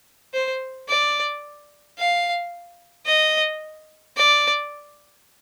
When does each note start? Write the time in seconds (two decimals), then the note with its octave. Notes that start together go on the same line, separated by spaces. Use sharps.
0.34 C5
0.89 D5
1.98 F5
3.06 D#5
4.17 D5